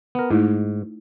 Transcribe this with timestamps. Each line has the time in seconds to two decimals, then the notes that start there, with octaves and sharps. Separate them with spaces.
0.15 B3 A#4
0.30 G#2 A3 D#4 E4